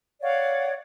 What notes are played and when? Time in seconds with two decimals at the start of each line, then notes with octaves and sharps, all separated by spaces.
0.22 C#5 D5 F5 F#5